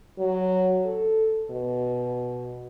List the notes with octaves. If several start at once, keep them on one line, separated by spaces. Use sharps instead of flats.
F#3
A4
B2